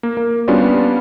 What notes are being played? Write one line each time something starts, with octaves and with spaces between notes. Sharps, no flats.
A#3
A#3
G3 B3 C#4 D4 F4 F#4